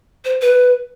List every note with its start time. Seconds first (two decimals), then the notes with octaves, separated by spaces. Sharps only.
0.25 C5
0.42 B4